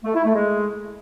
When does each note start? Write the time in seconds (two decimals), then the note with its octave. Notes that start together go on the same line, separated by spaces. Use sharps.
0.04 A3
0.14 E4
0.25 A3
0.35 G#3